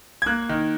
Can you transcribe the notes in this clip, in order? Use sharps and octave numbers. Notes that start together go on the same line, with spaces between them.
G#6
A#3 F#6
D#3